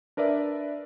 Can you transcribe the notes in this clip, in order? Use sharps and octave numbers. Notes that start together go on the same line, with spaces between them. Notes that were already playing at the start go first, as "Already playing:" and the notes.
D4 A#4 B4 D5 E5